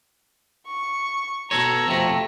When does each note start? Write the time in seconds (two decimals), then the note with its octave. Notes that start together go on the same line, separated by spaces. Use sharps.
0.67 C#6
1.51 B2 A4 C#5 A#5 A#6
1.87 F2 C3 A3